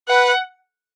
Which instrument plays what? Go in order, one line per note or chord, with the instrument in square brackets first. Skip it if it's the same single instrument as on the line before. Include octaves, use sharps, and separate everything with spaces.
[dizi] B4 [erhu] F#5